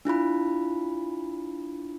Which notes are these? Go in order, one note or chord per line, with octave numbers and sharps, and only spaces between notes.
D4 E4 F4 B5